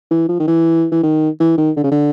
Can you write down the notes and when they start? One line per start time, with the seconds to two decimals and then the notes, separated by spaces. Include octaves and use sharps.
0.11 E3
0.29 F3
0.40 D#3
0.48 E3
0.92 E3
1.03 D#3
1.40 E3
1.58 D#3
1.77 D3
1.84 C#3
1.92 D3